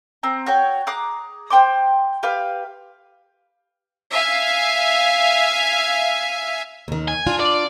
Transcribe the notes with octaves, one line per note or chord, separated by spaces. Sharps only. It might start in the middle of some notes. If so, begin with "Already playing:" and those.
C4 A#5
F#4 C#5 G5
G#4 A#5 D6 F#6
C5 G5 C6 D6
G4 B4 F5
E5 F5 G#5
D#2 D#3
G#5
D4 F4
D5